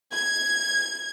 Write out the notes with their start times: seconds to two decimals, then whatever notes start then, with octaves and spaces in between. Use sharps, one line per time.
0.13 G#6